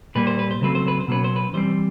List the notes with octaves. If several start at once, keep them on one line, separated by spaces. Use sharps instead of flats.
A#2 G3 A#3 B4
C5
B4
C5
C#3 F#3 A3 C4 B4
C5
B4
C5
B2 F#3 A#3 C#4 B4
C5
B4
E3 G3 C4 C5